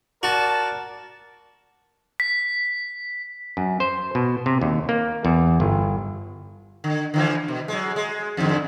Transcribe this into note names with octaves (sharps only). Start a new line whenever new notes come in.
F#4 A#4 D5 A5
B6
F#2
C5
B2
C3
D#2
A#3
E2
G1
D3
D3 E3 F3
B2
F#3 G#3
G#3
E2 G#2 D3